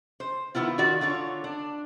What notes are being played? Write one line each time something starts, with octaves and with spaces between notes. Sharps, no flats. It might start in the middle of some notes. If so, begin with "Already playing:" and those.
C5
D#3 A3 B3 E4 F4
D#3 F4 F#4 D5
D3 F4 C#5
D4